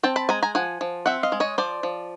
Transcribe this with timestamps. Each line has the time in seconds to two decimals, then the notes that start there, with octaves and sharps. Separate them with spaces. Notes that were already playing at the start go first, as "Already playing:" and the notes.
0.03 C4 G5 A5
0.16 A5 B5
0.29 G#3 G#5 A#5
0.43 G#5 A#5
0.55 F3 F#5 G#5
0.81 F3
1.06 C4 E5 F#5
1.23 D#5 F5
1.32 G#3
1.40 C#5 D#5
1.58 F3 C5 D5
1.83 F3